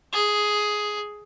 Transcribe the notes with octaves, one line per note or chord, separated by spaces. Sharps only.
G#4